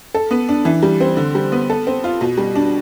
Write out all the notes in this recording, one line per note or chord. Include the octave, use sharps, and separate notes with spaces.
A4
B3
D4
E3
G3
C4
D3
G3
B3
A4
C4
F4
B2
G3
D4